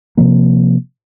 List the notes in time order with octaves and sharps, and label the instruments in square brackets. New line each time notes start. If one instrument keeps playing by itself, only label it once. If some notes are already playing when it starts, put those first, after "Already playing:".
[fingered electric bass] C3 F3 A#3